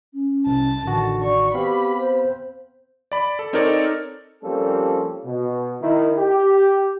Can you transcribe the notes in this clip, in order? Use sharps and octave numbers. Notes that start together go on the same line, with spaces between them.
C#4
C2 A5
A1 D3 D#3 F#4
D5 C#6
B3 C4 G4 F5 B5
C5
D5 B5
A4
C4 D#4 A4 A#4 C#5 D5
F3 G3 A#3 C4 C#4 A4
B2
D#3 E4
G4